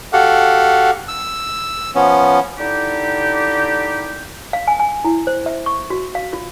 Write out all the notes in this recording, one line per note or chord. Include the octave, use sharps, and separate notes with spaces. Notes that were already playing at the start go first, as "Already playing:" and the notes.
F#4 G4 A4 F5 F#5
E6
F3 B3 C#4
D3 D#4 E4 G4
F5
G#5
G#5
E4
C5
E5
C#6
F#4
F5
F4